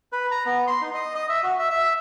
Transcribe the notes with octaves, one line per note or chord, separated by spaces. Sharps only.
B4
A#5
B3
C6
D#4
D#5
D#5
E5
F#4
E5
E5